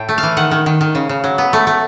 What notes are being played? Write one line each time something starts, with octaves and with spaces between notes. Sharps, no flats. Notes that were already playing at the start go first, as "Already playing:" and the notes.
Already playing: A2 G5
A3
F5
E3
D#3 F#5
D#3
D#3
D#3
C#3
C#3
F#3
B3
A3
A3